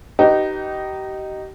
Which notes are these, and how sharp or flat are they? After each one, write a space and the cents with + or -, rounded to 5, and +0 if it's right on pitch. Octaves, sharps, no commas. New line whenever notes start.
D#4 -5 G4 -30 B4 +0